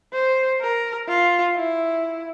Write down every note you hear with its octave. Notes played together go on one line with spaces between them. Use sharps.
C5
A#4
F4
E4